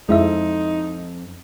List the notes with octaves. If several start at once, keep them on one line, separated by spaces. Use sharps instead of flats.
F2 G#3 D#4 E4 E5